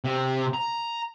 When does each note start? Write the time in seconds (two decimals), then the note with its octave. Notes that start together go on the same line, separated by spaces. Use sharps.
0.04 C3
0.54 A#5